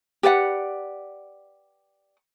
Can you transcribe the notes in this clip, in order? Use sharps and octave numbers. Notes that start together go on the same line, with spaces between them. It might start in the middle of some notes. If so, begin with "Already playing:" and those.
G4 B4 D5 F#5